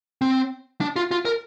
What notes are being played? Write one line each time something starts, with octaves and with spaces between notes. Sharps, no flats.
C4
D4
F4
F4
A#4